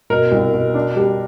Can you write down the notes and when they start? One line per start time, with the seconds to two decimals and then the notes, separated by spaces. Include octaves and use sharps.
0.10 B2 A#4
0.31 C2
0.54 B2
0.74 D4
0.96 G3